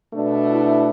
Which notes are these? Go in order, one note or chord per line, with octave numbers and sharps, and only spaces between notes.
B2 A3 D4
E4